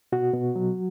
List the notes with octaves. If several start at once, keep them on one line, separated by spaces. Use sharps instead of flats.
B2 F#4
B2
F#3